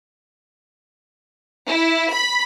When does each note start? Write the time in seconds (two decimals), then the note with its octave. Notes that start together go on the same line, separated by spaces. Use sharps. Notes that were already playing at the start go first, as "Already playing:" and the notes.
1.67 E4
2.12 B5